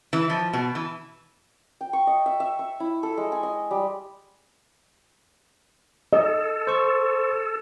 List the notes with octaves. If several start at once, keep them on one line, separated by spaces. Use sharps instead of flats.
E3
F3
B2
E3
G5
C#6
D#5
E5
E5
C#6
E4
A4
G#3
G#5
D#5
G3
A4 D#5
C5 C#6